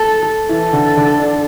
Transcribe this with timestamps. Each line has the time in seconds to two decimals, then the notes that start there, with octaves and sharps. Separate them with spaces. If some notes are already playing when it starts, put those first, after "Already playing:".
Already playing: A4
0.48 E3 A4
0.73 D3
0.97 D3
1.20 D4